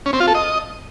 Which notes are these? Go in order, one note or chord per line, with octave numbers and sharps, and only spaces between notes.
C#4
C4
F4
A4
D#5